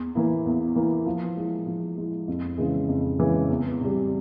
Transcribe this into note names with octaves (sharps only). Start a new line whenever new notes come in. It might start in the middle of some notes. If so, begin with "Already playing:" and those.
Already playing: E2
E3 A#3 E4
E2
E3 A#3 E4
F3
G#3 E4
F3
G#3 E4
F2
C#3 E3 G#3
F2
C#3 E3 G#3
E2
C3 G3